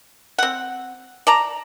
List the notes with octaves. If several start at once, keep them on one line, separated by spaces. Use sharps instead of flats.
C4 F#5
D5 A5 A#5